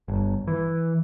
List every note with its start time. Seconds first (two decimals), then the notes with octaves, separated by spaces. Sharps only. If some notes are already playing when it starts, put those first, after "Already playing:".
0.08 G1
0.48 E3